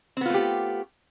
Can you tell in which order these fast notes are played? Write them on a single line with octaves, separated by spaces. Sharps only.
C4 B3 F4 A3 G4